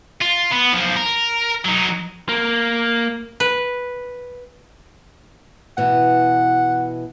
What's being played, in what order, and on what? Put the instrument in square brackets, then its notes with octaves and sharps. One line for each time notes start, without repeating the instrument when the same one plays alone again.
[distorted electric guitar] F4
B3
B1 F3
A#4
F#3 D#4
[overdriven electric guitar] A#3
[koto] B4
[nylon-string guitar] B2 E3 [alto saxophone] F#5